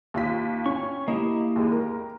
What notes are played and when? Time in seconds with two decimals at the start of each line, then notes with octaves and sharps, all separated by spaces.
0.14 D#2 F4 B6
0.66 C#4 C#6
1.08 A#3 E4 G4 D#5
1.56 D#2 G#3
1.72 A#4